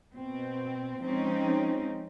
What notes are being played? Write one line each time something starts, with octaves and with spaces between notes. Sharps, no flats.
B2 C4
F3 G#3 C4 C#4 D#4